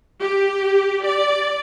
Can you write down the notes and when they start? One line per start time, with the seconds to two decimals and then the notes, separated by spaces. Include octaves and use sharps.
0.20 G4
1.05 D5